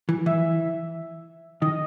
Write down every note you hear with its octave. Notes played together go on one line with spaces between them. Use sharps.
E3
E3 E5
D#3 D#5